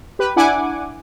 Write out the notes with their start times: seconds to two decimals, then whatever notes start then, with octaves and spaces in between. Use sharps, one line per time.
0.19 G4 B4
0.36 D4 E4 F#5 G#5 D6